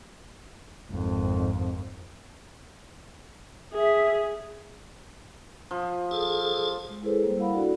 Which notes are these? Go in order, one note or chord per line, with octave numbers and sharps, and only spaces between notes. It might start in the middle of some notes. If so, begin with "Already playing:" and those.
G#1 F2
G#4 E5
F3
G#4 A4
G#3
G#3 E4 G#4 A4 B4 C5
G3 A#3
E4 A#4 F5 F#5 B5
D4 E4 F#4 A4 D5